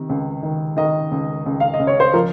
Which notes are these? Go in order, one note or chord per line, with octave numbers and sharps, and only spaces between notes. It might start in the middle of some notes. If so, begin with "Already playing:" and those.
Already playing: C3 D#3
C#2
D#3
D#3 D#5
C#2
C#2
F5
D#5
C#2
C#5
C5
F3 A#4